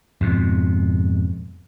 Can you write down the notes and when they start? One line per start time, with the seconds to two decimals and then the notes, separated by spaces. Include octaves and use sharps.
0.21 F2 G#2 B2